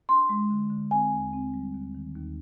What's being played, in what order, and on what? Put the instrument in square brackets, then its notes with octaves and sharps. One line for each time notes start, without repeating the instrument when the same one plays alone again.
[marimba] D4 C6
G#3
D3
D3
C4 G#5
D#2
C4
G3
D#2
D#3
D#2